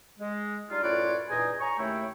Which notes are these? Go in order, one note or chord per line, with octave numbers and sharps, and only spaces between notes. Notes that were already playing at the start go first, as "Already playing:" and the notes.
G#3
G3 D4 D#4 F4
F#2 A2 F4 B4 C#5 D5
E2 G2 A#2 D#4 D#5 G#5
C#5 G#5 A#5 C#6
D#2 C#3 A3 E4 C#5 G5